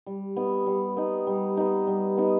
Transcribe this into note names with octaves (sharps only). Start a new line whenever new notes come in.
G3
B3 D#4
G3
B3 D#4
G3
B3 D#4
G3
B3 D#4